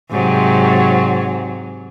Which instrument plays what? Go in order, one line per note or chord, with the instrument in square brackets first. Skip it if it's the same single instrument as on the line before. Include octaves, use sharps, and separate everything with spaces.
[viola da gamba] G#2 C3 F#3